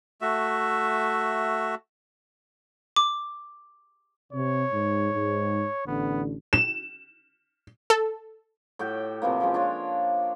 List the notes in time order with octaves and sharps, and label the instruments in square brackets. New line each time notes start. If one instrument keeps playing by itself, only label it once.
[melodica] A3 F#4 E5
[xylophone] D6
[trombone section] C3 [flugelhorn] C#5
[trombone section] G#2
G#2
[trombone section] A1 D3 [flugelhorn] B3
[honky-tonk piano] E7
[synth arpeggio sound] A4
[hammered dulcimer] A2 F#4 G4 G5
C3 E3 F3 A#3
F3 G#3 C#4
D4 F4 C#5